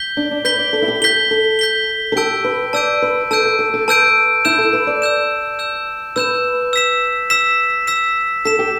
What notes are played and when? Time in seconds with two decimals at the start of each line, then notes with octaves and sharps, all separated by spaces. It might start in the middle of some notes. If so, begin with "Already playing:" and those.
Already playing: G6 B6 G7
0.17 D4
0.31 D4
0.45 B4 G6 B6 G7
0.59 D5
0.73 A4
0.82 E4
0.88 G4
1.02 A4 G6 B6 G7
1.31 A4
1.59 G6 B6 G7
2.12 A4
2.16 G4 A5 E6 G6 D7
2.44 B4
2.73 D5 A5 E6 G6 D7
3.02 B4
3.31 A4 A5 E6 G6 D7
3.45 A4
3.59 A4
3.74 A4
3.88 B4 A5 E6 G6 D7
4.45 E4 E6 G6 E7
4.58 A4
4.73 B4
4.87 D5
5.02 E6 G6 E7
5.59 E6 G6 E7
6.16 B4 E6 G6 E7
6.73 E6 B6 E7
7.30 E6 B6 E7
7.87 E6 B6 E7
8.45 A4 E6 B6 E7
8.59 G4